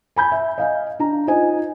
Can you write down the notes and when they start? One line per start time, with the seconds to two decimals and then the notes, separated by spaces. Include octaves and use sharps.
0.16 G#5 B5 G6
0.32 E5
0.58 D#5 F5 G#5
0.99 D4 A#5
1.27 D#4 F4 C5 D#5 G#5